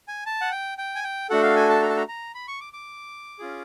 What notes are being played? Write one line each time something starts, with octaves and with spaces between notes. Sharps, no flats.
G#5
A5
F#5
G5
G5
G#5
G5
A3 D4 F#4 A4 F#5
F5
G#5
A5
A#5
A5
A#5
A#5
B5
C#6
D6
D6
C#4 F4 G#4